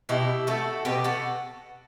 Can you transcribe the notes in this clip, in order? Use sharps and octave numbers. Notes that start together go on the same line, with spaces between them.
B2 E4 G4
A3 F#4 A4
B2 G4 B4
F#4 A4